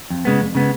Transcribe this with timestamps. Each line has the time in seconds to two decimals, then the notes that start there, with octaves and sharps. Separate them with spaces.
0.10 F2
0.25 C#3 G#3 B3
0.41 F2
0.55 C#3 G#3 B3